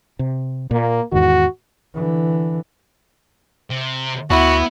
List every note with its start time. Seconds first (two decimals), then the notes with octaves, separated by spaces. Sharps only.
0.19 C3
0.71 A#2 A#3
1.12 E2 G#2 D#3 F#4
1.94 D3 E3
3.70 C3
4.30 D2 B3 E4 F#4